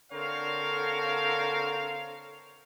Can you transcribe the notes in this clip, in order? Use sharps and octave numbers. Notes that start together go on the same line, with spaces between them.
D3 C4 A#4 C#5 F5